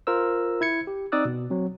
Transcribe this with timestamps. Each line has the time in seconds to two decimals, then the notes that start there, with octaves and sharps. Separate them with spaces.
0.07 F4 A#4 C5 E6
0.61 E4 G#6 C#7
0.87 G4
1.12 C4 D#4 D5 D#6 E6 F#6
1.25 B2
1.50 F#3 C4